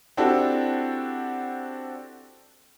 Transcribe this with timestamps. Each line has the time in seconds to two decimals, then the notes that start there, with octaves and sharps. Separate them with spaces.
0.17 C4 D4 E4 F#4 G4 A4